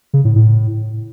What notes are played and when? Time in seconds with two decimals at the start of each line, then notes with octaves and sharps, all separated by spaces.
0.13 C#3
0.25 A2
0.36 A2